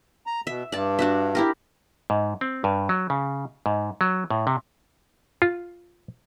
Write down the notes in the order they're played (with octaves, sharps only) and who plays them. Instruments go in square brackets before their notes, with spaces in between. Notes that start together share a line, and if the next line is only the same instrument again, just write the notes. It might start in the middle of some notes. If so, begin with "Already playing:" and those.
[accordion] A#5
[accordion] B2 [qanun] E5
[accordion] G2 [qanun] D5 A5
[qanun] D4 F#4 E5
E4 G4 A#4
[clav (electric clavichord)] G#2
C4
G2
F#3
C#3
G#2
F#3
A2
C3
F4